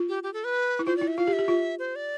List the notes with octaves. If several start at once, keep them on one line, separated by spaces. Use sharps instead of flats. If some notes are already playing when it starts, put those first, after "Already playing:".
Already playing: F4
G4
G4
A4
B4
E4
F4 C5
D5
E4
E5
F4 F5
G4
E5
G4
F4
C5
D5